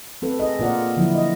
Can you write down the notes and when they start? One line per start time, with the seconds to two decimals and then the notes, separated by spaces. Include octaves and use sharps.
0.22 C4 A4 B4
0.39 G#4 A4 D#5
0.59 A#2 A#3 F4 A#4 D5 F#5
0.97 D3 F3 F#3 E4
1.15 D#5